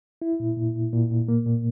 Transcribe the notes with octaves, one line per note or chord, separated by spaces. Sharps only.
E4
A#2
A#2
A#2
A#2
A#2
A#3
A#2